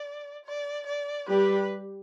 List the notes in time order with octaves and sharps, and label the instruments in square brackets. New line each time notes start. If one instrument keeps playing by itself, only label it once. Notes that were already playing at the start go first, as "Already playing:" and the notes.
Already playing: [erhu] D5
D5
D5
[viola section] G3 G4 [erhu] B4